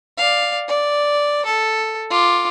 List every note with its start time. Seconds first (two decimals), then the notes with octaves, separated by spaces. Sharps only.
0.17 D5 F5
0.68 D5
1.45 A4
2.10 F4 D6